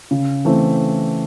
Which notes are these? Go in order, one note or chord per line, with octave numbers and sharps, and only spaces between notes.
C#3
E3 A3 C4